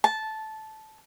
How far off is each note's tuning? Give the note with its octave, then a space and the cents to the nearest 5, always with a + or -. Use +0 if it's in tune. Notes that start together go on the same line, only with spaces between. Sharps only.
A5 -10